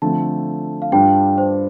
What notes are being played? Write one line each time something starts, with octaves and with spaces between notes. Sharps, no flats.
D3 F3 A3 C4 A5
F5
G2 G3 D4 F4 G5
C5